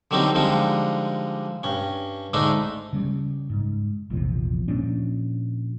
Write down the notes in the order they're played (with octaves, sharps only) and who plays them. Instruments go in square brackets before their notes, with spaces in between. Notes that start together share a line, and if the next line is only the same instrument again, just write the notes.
[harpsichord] D3 D#3 F#3 G3 C4 D#4
D3 F3 G3 G#3 D#4
G2 C#4
G#2 D3 A3 D4 D#4
[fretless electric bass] C#3 G3
G#2
A#1 E2 C3 F3
A#2 F3 C#4 D4